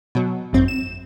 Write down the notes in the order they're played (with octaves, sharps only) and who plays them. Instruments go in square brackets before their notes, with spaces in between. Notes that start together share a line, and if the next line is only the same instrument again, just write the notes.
[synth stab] B2 F#3
G#1 F#2 C4
E7